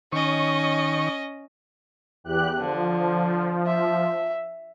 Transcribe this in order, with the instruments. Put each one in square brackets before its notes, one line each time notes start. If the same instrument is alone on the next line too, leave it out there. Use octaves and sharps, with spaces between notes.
[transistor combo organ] D#3 C#5 C#6 [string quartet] C#4 D#5
[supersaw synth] E2 G4 F#6
[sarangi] D3 [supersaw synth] F3
[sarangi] E5